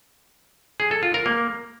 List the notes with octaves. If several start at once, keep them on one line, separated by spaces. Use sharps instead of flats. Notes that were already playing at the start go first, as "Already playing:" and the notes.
G#4
A4
F4
A#4
A#3